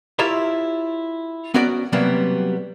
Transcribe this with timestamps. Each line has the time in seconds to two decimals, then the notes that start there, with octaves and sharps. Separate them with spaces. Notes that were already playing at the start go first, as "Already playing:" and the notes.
0.19 E4 F4 G4 A#4 C#5 E5
1.54 B3 C#4 F#4 A#4 D5
1.93 C3 F#3 G3 A#3 B3